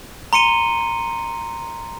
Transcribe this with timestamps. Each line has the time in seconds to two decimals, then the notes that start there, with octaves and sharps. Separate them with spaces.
0.33 A#5 C6 C#7 D#7 G7